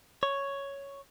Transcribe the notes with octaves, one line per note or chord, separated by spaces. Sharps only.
C#5